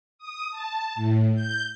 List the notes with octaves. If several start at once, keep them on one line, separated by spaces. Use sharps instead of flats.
D#6
A5
A2
G6